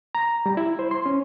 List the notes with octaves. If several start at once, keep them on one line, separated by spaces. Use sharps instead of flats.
A#5
G3
E4
C5
C6
C#4